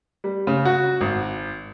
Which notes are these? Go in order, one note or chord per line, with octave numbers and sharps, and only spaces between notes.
G3
C#3
F#4
G#1